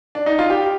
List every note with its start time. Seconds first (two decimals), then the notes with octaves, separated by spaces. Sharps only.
0.15 D4
0.26 D#4
0.39 F4
0.50 G4